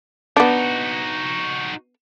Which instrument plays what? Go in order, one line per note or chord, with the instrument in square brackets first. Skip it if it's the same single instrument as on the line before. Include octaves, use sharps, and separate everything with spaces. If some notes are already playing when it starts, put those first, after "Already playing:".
[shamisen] B3 D4 [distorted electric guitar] D#4 F#4